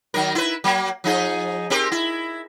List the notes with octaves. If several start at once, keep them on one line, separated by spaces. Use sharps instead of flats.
D#3 F#3 A#4
E4 B4
F#3 A#3
F3 D#4 G#4
C4 G4 A#4
E4